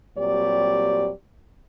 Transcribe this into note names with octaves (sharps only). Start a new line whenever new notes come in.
A#2 F#3 G3 C4 G4 D5